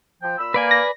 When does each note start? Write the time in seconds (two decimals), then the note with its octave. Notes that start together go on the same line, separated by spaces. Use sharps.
0.22 F3 G5
0.38 A#2 B5 E6
0.54 A#3 B4 D5 G#5
0.71 A#6